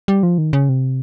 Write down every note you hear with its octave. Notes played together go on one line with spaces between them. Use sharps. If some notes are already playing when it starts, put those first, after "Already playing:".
G3
F3
D#3
C#3
C3